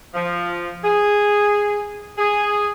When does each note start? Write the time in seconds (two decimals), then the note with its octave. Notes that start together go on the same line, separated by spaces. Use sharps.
0.14 F3
0.83 G#4
2.18 G#4